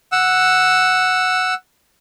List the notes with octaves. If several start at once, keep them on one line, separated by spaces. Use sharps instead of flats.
F#5 E6